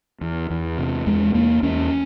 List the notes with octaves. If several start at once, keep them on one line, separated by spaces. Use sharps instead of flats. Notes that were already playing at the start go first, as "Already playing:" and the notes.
E2
E2
C3
E2 G#3
E2 A#3
E2 C#4